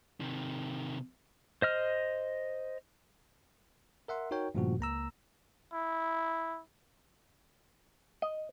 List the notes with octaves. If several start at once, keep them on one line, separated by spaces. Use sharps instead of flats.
C3 D#3
C5 D#5 F6
A#4 E5 F#5 C6
D#4 F#4 A#4 C#5 G5
G2 A#2 C#3 F3 A3 F#4
C#2 A#3 A#5 E6
E4
D#5